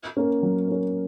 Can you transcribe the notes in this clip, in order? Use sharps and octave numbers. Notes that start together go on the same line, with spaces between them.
A#3 C#4
F#3
A#3 C#4